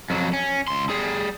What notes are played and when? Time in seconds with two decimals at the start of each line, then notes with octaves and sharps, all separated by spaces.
0.10 F2 F#3
0.33 C#4
0.68 C#2 C6
0.90 G3 G#4